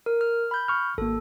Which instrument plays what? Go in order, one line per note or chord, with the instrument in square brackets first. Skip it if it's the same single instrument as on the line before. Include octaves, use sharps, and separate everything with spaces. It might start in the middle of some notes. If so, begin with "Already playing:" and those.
[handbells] A#4
F6
B5 G6
[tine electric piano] C#6 F6
[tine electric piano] G#1 A#3 [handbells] A4